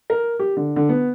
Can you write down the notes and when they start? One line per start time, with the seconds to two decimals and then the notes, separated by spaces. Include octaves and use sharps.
0.10 A#4
0.40 G4
0.57 D3
0.76 D3
0.89 B3